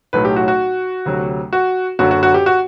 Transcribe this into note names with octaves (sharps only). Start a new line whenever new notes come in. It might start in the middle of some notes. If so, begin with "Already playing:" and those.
B1 A2 F#3 B4
G4
F#4
F#4
D2 C3 F#3
F#4
F#1 F#2 D3 F#4
F#4
F#4
G4
F#4